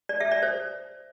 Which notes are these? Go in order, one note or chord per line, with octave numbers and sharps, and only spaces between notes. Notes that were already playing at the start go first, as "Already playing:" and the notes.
D5
E5
D5
C5